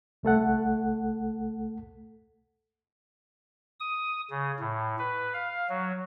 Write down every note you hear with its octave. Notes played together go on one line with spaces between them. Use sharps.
C2 A3 A4 F#5
D#6
C#3
A2
B4
F5
F#3